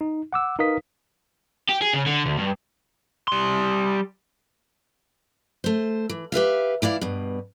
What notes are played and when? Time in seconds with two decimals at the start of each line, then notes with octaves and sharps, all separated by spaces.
0.01 D#4
0.33 F#5 D6 E6
0.59 D#4 A#4 B4 F5 D#6 B6
1.69 G4
1.81 G#4
1.93 C#3
2.06 D3
2.26 D2
2.38 G2
3.28 G3 C6
5.64 A3 C5
6.09 E3
6.32 G4 B4 E5 F5
6.82 E3 E4 D5 F5
7.01 G2 B2